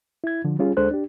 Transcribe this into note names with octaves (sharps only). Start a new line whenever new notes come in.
E4 G#6
D3 F3
G3 C#4 F4 G#4
D2 G#3 D4 A4 C5 F#6
D4 G4